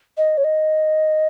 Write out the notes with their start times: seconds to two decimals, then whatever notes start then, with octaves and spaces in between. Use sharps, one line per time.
0.17 D#5
0.37 C#5
0.44 D#5